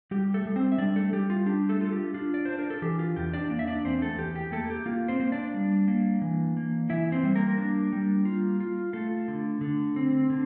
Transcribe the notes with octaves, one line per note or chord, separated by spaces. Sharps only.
G3 G4
A3 A4
G3
C4 C5
E5
G3 D4 D5
A3 A4
G3 G4
F4
D4 G4
A3 A4
F4 A4
G4
D4 F4
D5
D4 C5
A#4
A4
E3 G4
F4
E2 G4
D4 D5
A#3
E5
D4 D5
E2 C4 C5
A3 A4
E2 G4
G4
A3 A#3 A4
G4
A#3 F4
C4 C5
A#3
D4 D5
G3
A#3
E3
A#3
E3 E4 E5
C4 C5
G3
A#3 A#4
D4
G3
F4
F4
A3 F4 A4
D3
D3
C4
D3